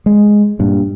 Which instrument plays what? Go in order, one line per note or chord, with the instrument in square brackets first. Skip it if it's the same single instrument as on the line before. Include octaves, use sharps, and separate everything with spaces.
[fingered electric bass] G#3
G2 A#2